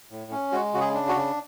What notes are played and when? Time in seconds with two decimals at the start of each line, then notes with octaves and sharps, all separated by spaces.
0.11 A2
0.31 C#4
0.52 G#3 F#4
0.74 C#3 F#4
0.81 G#4
0.94 D4
1.09 F#4
1.15 C#3